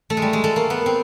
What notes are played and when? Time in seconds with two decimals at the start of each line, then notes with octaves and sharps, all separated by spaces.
0.10 A3
0.17 G#3
0.22 G3
0.33 G#3
0.44 A3
0.56 A#3
0.70 B3
0.86 C4